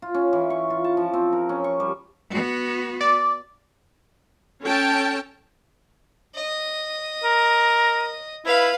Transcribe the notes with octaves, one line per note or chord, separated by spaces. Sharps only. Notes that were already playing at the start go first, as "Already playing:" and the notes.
F4
C#4
E3
C#6
F4
A5
F3
C4
A#4
C#4
C#6
G3
B3 F#4
D5
C#4 A4 C#5 G5 A5
D#5
A#4
E4 B4 F5